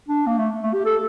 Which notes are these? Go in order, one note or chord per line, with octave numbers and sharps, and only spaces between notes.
D4
A#3
A3
A3
G4
A4